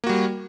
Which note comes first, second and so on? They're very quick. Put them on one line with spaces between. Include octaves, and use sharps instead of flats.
A#3 F#4 G3